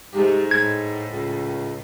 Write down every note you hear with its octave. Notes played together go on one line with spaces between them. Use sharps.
G#2 C3 G#3 A3 G4
A2 G#3 D#4 G#6
C#2